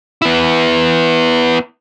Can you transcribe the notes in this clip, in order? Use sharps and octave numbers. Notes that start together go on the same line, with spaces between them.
B3 E4